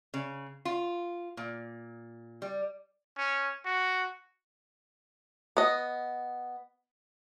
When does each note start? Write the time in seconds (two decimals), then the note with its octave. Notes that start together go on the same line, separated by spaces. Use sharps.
0.14 C#3
0.65 F4
1.37 A#2
2.42 G3
3.17 C#4
3.65 F#4
5.57 B3 D#5